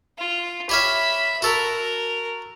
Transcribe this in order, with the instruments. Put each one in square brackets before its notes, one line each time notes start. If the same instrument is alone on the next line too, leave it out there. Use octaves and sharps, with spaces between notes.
[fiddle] F4
[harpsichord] G4 C#5 F5 [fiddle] E5 B5
[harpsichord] F#4 A4 [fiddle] A#4